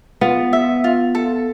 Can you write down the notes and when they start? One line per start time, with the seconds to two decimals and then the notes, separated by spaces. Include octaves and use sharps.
0.21 B3 F4
0.53 E5
0.84 F4
1.15 A4